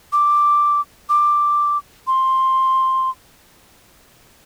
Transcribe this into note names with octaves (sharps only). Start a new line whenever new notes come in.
D6
D6
C6